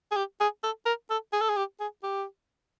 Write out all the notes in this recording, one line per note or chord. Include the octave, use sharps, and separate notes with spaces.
G#4
G4
G#4
A4
A#4
A4
G#4
A4
G#4
G4
G#4
G4